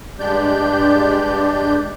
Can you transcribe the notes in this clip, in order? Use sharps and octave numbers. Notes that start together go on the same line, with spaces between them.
G2 G#3 D4 G4 D5 G6